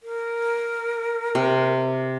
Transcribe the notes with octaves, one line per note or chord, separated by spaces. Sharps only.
A#4
C3